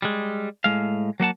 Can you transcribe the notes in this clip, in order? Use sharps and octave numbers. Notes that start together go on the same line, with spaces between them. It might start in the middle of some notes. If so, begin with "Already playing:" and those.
G3 G#3
A2 G#3 F5
F#3 A#3 F#5 A5